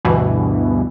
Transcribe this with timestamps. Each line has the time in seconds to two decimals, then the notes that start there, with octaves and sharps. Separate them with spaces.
0.05 D2 G2 B2 E3